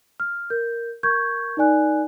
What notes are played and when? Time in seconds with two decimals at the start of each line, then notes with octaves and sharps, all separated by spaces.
0.20 F6
0.50 A#4 G6
1.03 A#4 C#6 G6 G#6
1.57 D#4 A#4 D5 G#5 F#6